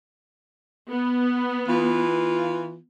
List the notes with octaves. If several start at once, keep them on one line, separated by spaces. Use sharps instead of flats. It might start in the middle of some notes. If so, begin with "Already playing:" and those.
B3
E3 F4